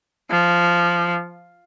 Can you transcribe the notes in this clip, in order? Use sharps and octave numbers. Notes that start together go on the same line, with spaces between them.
F3